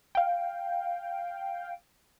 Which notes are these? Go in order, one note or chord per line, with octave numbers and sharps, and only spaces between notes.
F5 G5